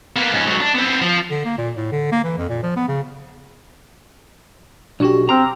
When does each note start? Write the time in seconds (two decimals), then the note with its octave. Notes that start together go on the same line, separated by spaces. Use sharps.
0.16 A#3 B3
0.32 G#2 C#4
0.47 G#2 F#3
0.60 D4
0.75 B3 C4
1.01 F3
1.31 D3
1.45 A#3
1.58 A#2
1.76 A2
1.92 D3
2.12 A#3
2.24 E3
2.38 F2
2.49 A#2
2.63 F3
2.76 B3
2.88 C#3
5.00 B1 D4 F#4 G4
5.29 C4 A#5 C6 D6 F6